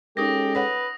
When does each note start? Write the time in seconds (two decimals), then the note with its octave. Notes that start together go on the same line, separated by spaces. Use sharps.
0.17 G#3 C#4 D#4 G4 A4 A#4 D#6 A#6
0.55 B4 C#5 F#5